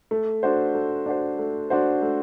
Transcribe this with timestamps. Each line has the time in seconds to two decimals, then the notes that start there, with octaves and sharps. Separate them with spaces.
0.11 A3
0.43 D4 F#4 C5
0.74 A3
1.06 D4 F#4 C5
1.39 A3
1.70 D4 F#4 C5
2.02 A3